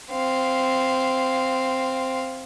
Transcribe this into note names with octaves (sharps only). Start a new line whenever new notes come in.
C4 F5